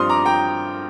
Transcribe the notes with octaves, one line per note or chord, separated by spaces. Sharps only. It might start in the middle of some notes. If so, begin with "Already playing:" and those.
Already playing: G2 F3 C4 C6 D#6 F6
A#5 D6
G5 A#5